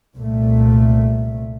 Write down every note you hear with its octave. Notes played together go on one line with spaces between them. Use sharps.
C2 A#2 A3